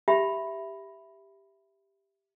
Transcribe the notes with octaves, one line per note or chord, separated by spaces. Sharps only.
G4 E5 B5